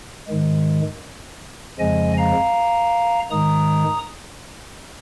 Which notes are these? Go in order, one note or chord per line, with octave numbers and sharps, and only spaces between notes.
G#2 D#3 G#3
F2 C#3 F3 G#3 D#5 G#5
F5 A#5
G#2 D#3 G#3 A#5 D#6